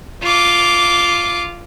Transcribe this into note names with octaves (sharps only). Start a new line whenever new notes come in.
F4 D6